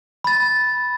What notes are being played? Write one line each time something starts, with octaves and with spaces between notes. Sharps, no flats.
B5 A6